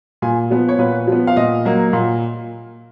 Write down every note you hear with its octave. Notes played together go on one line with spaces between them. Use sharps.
A#2 G#5
F3 B3
C#5
A#2 B4
F3
B3
F5
A#2 D#5
F#3 A#3
A#2